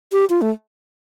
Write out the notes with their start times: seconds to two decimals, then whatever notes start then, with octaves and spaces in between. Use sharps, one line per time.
0.12 G4
0.30 F4
0.42 A3